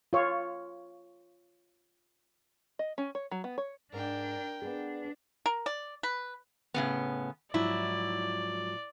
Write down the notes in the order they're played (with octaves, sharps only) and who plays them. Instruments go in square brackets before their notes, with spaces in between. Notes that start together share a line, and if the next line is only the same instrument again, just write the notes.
[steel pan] F4 C#5
[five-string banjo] D#5
C#4
C#5
F#3
B3
C#5
[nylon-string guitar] G#2 [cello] D4 [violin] A#4 G5
[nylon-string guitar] B3 G#4 [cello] D4
[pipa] A#4
D5
B4
[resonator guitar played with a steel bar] A2 C#3 B3
[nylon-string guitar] G#2 F3 F#3 [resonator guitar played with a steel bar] E4 [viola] D5